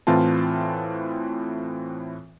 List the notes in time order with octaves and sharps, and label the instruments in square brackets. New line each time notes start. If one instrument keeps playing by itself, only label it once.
[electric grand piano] A2 E3 C4 F4 A5